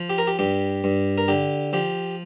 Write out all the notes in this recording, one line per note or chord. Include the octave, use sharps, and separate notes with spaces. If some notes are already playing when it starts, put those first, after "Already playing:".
Already playing: F3
G4
A#4
G4
G2 G4
G2
A#4
D3 G4
F3 G4